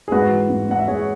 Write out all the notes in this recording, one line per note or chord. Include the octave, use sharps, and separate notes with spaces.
G#4
G#2 F#4 B4
E3
G#2
G#2 F#5
E5
G#2 G#4 C#5